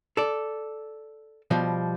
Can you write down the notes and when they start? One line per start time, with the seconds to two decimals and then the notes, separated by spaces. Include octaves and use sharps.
0.17 A4 D5
1.51 B2 F3 G3